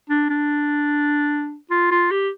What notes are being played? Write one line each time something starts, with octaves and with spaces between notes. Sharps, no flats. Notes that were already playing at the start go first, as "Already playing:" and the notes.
D4
D4
F4
F4
G4